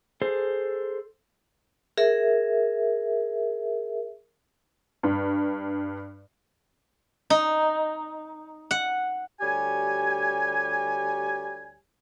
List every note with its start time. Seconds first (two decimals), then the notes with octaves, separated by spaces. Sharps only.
0.22 G#4 A4 C5
1.97 G#4 A#4 E5
5.03 G2
7.30 D#4
8.71 F#5
9.41 D2 G3 G4 C#5 G#5